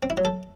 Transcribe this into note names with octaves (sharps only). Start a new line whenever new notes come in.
C4
E4
F#3
A4